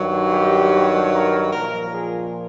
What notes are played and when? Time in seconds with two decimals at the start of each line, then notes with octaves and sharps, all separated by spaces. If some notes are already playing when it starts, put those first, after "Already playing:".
Already playing: G2 D#3 F#3
0.32 G4
1.13 A#4
1.53 A#2 F3 A#4
1.93 G#4